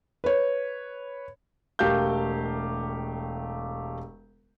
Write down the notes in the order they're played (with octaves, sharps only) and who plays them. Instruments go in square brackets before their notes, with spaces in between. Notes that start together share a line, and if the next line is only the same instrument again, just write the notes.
[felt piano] B4 C#5
[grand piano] E1 A3 G4 A#4 F5 G6